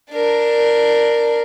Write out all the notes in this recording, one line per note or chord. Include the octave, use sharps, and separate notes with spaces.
D4 A#4